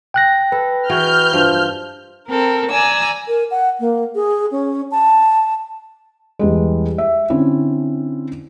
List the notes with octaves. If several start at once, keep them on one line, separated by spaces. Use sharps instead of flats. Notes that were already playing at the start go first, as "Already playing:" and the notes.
G5 F#6 A#6
A4 B4
E3 F#4 G#4 F6 G6
G2 F3
C4 A4 A#4
D5 G#5 A#5 E6
A#4
F#5
A#3
G#4
C#4
A5
E2 G3 G#3
E5
D3 C4 C#4 E4